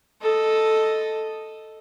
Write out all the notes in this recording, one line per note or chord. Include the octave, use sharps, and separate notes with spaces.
A4 D#5